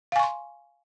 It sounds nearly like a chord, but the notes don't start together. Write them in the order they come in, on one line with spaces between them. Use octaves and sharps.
F5 G#5 C#6 C6